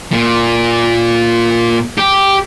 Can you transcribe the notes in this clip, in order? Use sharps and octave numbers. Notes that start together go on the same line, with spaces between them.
A#2
G4